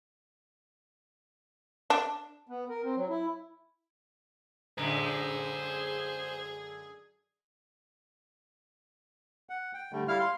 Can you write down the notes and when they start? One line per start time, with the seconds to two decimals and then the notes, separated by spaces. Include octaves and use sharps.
1.90 D4
2.48 B3
2.69 A#4
2.83 C4
2.97 F#3
3.09 E4
4.78 F#2 D3 G#3 G#4 C5 A#5
9.49 F#5
9.74 G5
9.92 D3 G3 A3
10.08 G3 E4 F5 F6
10.20 F5 C6